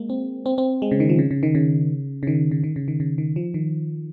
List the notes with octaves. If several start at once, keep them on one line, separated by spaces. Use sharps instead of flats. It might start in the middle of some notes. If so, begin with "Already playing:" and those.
Already playing: G#3 A#3
C4
C4
C4
G#3
C#3
D#3
F3
C#3
C#3
D#3
C#3
C#3
D#3
C#3
D#3
C#3
D#3
C#3
D#3
F3
D#3